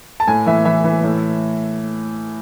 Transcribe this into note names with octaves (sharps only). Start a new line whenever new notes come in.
A5
A2 G#5
E3 E5
E3 E5
E3
A2